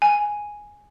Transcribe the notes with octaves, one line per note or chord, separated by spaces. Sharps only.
G#5